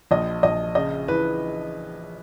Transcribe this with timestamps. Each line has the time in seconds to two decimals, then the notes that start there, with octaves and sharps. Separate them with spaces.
0.11 A#1 D#5
0.43 A#1 D#5
0.75 C#3 D#5
1.08 E3 B4